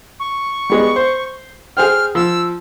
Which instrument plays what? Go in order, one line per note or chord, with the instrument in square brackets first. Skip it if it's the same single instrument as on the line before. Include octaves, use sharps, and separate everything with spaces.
[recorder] C#6
[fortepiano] G3 G#3 B3
C5
[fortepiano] G#4 C5 G5 [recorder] F6
[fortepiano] F3 [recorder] E6